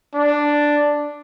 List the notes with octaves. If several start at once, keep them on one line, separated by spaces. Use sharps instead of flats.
D4